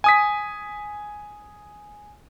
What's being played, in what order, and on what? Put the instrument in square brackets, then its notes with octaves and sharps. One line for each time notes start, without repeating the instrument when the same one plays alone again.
[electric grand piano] G#5 D#6 B6